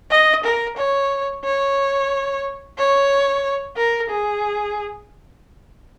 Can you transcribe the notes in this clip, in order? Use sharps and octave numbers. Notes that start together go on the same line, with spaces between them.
D#5
A#4
C#5
C#5
C#5
A#4
G#4